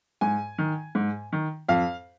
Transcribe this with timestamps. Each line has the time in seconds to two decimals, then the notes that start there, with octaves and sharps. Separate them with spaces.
0.21 G#2 G#5
0.58 D#3
0.95 G#2
1.32 D#3
1.69 F2 F5